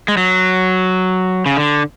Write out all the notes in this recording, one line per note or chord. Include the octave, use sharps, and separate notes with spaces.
G#3
F#3
C#3
D3